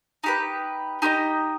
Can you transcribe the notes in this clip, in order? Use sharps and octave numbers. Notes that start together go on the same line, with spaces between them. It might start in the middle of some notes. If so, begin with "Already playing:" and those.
D#4 G4 B4
D#4 G4 B4 D#5